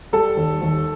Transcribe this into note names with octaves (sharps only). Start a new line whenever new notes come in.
G3 A4
D#2
D#2